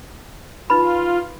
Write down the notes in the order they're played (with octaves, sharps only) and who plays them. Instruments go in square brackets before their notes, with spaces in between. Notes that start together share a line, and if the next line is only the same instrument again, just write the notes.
[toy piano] D#4 B4 B5 [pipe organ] F4